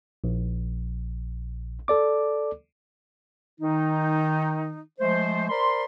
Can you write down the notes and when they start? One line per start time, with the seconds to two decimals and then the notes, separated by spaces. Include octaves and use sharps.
0.24 A#1
1.88 A4 D5 D6
3.60 D#3 D#4
5.00 F3 G#3 A3 C5
5.49 A#4 C5 D5 B5 C6